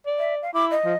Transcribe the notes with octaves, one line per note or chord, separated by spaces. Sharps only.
D5
E5
F5
E4 D6
D#5
F3